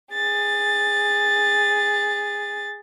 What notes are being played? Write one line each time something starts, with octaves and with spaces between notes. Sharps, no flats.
G#4 A6